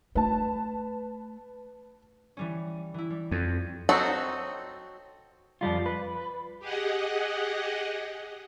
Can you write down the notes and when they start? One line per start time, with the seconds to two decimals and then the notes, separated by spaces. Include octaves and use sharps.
0.15 A3 B4 A5
2.37 E3 G3 C#4
2.94 E3 E4
3.10 G3
3.31 F2 D#7
3.89 F#3 C4 D#4 F#4 A4
5.61 F2 F3 G3 F4
5.86 B4
6.59 G4 G#4 D#5 F#5